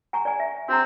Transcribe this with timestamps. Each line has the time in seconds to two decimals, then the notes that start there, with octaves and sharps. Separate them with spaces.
0.13 G#5 A#5 C#6
0.25 D5 G#5
0.40 E5
0.69 C4 F#4 A#5